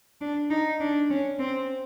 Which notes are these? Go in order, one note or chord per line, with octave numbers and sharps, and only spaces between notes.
D4
D#4
D4
C#4
C4